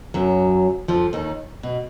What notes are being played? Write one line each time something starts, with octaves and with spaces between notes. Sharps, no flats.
F#2 F#3
F2 F3
D#2 D#3
B2